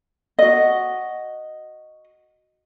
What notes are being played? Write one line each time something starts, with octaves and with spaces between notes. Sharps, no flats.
F#4 D#5